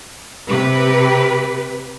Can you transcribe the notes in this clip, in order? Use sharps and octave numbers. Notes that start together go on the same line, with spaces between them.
C3 G4 B4